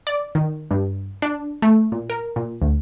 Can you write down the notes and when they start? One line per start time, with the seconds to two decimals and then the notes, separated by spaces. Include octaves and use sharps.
0.07 D5
0.35 D#3
0.71 G2
1.22 D4
1.62 A3
1.92 A#2
2.10 A#4
2.36 A#2
2.62 D2